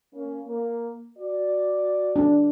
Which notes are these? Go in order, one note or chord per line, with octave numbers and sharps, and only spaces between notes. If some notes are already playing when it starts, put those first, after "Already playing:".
A#3 C#4
A#3
F#4 D5
D4